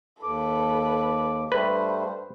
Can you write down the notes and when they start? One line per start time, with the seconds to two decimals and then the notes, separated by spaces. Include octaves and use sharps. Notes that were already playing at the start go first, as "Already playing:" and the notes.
0.23 D#2 A4 B4 D6
1.52 G2 G3 A3 B4 C5